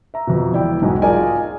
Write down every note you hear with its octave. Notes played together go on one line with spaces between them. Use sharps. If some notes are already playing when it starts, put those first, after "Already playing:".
E5 A#5
F2 B2
E1 E4 D5 G5
B1 G#2 F#4 D#5 G#5
F4 G#4 A#4 D5 D#5 G#5